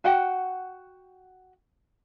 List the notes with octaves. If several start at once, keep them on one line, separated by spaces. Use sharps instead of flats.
F#4 F#5 G5